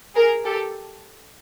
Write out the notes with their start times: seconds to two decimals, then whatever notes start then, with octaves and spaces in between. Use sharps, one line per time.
0.15 G#4 A#4
0.45 G4 A4